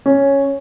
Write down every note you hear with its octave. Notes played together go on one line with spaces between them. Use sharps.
C#4